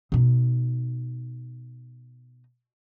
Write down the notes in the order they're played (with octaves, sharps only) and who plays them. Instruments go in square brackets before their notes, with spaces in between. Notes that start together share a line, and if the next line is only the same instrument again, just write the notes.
[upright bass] B2 D#4